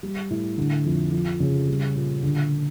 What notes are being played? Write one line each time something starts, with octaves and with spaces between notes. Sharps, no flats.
G3
A2
D3
F2
F3
C#3
G3
A#2
D3